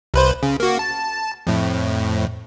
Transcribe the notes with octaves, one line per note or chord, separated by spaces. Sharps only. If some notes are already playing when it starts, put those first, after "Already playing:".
C2 B4 C5
C#3
A#3 F#4
A5
F2 A2